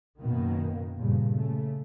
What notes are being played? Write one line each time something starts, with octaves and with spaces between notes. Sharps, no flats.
F#2 B2 D#3 A#3
G2 A#2 C#3
C#3 A3